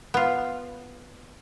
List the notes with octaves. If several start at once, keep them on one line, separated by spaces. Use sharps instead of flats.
B3 F4